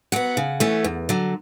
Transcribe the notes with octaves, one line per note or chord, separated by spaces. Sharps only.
F#3 B3 F#5
C#3
E3 A3 C#4
E2
D3 F#3